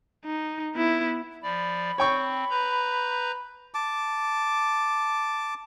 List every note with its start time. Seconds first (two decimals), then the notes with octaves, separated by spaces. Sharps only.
0.25 D#4
0.74 B3 E4
1.43 F3 D5 B5
1.98 C4 C#5 G5 C#6
2.50 B4 A#5 G6
3.74 A5 D6